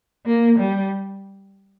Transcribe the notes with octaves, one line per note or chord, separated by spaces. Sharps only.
A#3
G3